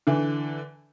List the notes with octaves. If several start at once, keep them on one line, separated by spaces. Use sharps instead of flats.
D3 E3